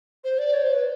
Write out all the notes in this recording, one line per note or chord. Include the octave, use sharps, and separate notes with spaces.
C5
D5
C#5
C5
B4